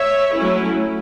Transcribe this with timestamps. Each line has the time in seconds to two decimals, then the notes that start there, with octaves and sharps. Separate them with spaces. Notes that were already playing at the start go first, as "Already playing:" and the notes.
Already playing: C#5 E5
0.37 F#3 A3 C#4 E4